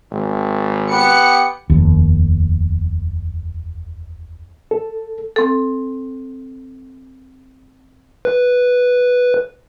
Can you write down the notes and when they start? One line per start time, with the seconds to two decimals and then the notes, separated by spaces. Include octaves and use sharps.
0.11 G#1
0.91 B3 G4 B4 C#7
1.70 F1 D#2
4.71 A4
5.36 C4 A4
8.25 B4